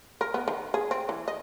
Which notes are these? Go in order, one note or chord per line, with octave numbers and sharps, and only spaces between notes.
A#4
B3
D#3
G#4
C4
E3
D#5